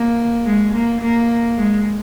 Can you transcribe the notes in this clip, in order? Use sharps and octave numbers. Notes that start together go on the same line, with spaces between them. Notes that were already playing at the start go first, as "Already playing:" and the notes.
Already playing: A#3
G#3
A#3
A#3
G#3